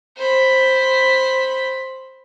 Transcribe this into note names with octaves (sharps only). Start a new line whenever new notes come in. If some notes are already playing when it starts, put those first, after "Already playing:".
C5 B5